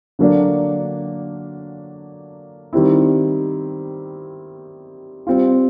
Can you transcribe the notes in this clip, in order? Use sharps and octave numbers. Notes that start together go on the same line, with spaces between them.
D3 F#3 A#3 D4
D#3 G3 C4 E4
G3 C4 F4